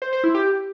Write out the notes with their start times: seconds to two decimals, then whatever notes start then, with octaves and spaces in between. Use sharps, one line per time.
0.02 C5
0.13 C5
0.24 E4
0.35 G4